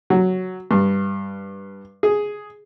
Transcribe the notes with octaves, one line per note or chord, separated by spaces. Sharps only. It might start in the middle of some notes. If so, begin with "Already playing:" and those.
F#3
G2
G#4